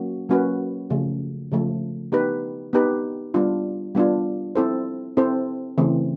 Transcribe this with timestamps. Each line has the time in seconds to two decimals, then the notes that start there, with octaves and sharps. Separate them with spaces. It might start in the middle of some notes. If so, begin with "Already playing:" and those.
Already playing: F#3 A#3 C#4 F#4
0.29 F#3 A#3 C#4 F#4 B4
0.90 C#3 F3 A3
1.52 C#3 F3 A3
2.12 B3 D#4 G4 B4
2.73 B3 D#4 G4 B4
3.34 G3 B3 D4 F4
3.95 G3 B3 D4 F4
4.55 C4 E4 A4 C5
5.17 C4 E4 A4 C5
5.78 C#3 E3 A3 C4